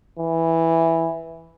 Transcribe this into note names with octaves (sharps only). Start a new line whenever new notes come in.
E3